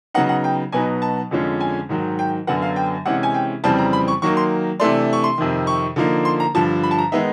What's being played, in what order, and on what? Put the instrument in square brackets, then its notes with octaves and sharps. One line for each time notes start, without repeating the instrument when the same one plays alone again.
[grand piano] C#3 F#3 B3 D#4 F#5
F#5
G5
B2 F#3 B3 D#4 G#5
A5
F2 D3 F3 G#3 C#4
G#5
G#2 D#3 F#3
G5
F#2 D3 F#3 B3 F#5
F5
G5
C3 E3 G#3 C#4 F#5
G#5
G5
F2 C#3 E3 G3 C4 A5
A#5
B5
C#6
D#3 F#3 A#3 D#4 C#6
C6
C3 E3 A3 D4 C6
C#6
C6
F2 C3 D#3
C#6
D3 F3 A#3 D#4
C6
A#5
G2 D3 F3 A5
B5
A5
A#5
D#3 G#3 B3 D#4 E5